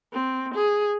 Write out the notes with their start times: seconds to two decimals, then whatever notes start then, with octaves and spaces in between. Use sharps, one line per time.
0.13 C4
0.55 G#4